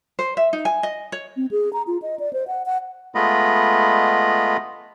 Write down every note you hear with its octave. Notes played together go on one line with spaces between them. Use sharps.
C5
E5
D#4
G#5
D#5
C#5
C4
G#4
A#5
F4
D#5
D5
C5
F#5
F#5
G#3 A3 B3 F4 D#5 B5